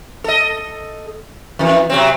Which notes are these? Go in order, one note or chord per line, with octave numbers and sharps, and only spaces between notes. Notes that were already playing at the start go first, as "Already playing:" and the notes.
A4 D#5
F2 E3
C3 F#3 C4